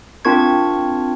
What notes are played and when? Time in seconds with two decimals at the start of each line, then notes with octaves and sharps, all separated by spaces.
0.25 C4 D4 F4 A#4 C#6 G#6